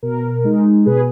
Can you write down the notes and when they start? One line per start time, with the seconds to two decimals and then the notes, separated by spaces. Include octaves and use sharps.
0.03 B2 A#4
0.44 G#3 D#4
0.86 B2 G#4 B4